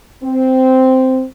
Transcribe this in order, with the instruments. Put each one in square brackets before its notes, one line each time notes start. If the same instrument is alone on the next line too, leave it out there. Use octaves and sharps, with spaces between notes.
[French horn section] C4